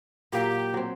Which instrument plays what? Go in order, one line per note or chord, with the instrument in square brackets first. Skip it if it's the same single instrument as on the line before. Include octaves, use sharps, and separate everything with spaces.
[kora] A#2 F#3 A#3 [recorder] G4
[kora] F#3 C4